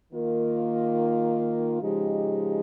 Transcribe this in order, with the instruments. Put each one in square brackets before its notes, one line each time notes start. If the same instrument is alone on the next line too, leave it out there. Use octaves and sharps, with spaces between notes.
[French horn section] D#3 A#3 F4
C#3 F3 G#3 D#4 G4